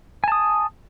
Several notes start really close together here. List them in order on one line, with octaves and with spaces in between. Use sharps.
G#5 A5 D#6